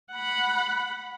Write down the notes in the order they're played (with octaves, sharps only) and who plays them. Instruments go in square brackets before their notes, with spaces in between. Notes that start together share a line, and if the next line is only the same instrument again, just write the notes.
[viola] F#5 B5